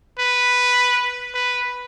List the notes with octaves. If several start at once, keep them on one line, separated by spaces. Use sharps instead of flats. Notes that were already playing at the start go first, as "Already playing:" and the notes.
B4
B4